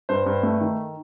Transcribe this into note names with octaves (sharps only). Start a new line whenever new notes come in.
G2 C5
G2
A3
D#3